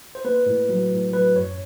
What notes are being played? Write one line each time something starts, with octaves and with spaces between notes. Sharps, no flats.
C5
A#3 B4
A2
F#3
A2
F#3 B4
F#2 C#5